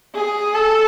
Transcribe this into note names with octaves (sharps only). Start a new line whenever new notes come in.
G#4
A4